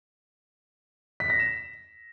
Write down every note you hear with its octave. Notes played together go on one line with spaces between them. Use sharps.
B6
A#6
E7